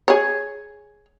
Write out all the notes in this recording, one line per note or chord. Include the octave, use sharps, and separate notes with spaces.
G#4 C#5